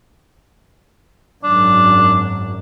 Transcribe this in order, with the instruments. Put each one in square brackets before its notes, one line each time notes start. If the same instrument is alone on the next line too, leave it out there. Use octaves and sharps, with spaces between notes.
[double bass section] G#1 F#2 [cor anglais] D4